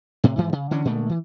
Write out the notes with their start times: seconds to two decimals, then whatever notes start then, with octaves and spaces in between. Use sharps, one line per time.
0.24 A2 C3
0.37 G#2 E3 F3
0.53 C#3
0.71 D3 E3 C#4 D4
0.85 A#2 D3 G#3 A3
1.09 E3